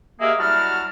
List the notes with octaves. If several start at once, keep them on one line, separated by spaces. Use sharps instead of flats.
G#3 A#3 G4 G#4 A#4 E5
F#3 G3 E4 F#4 A5 F6